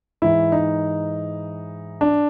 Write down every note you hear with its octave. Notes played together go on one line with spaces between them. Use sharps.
G#2 E3 E4
D#4
D4